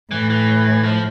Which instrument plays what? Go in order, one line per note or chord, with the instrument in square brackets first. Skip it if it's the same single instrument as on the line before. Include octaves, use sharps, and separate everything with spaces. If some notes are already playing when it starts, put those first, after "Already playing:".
[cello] A2 [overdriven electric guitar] E3
[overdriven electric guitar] E3
F3